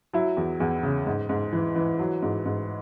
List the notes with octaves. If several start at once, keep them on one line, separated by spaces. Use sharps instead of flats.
F#3 E4
E2
E2
C#3
G#2
G#2
E3
E3
F#3
G#2
G#2